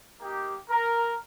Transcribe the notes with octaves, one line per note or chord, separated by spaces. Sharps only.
A#3 D#4 G4
A#4